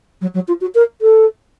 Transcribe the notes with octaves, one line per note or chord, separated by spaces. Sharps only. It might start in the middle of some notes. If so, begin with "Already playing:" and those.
F#3
F#3
F4
F#4
A#4
A4